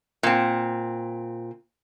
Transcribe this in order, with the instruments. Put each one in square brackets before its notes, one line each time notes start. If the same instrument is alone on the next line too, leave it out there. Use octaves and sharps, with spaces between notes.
[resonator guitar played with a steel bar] A#2 C4